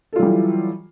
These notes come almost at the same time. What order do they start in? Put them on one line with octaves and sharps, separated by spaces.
A4 F4 F#3 G3 E3